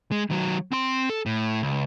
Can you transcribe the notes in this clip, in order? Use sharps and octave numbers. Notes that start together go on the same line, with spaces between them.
G#3
D#3 F#3
C4 C6
A4
A2
C#2